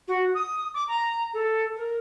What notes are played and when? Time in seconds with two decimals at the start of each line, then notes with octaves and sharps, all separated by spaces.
0.07 F#4
0.34 D#6
0.74 D6
0.87 A#5
1.33 A4
1.76 A#4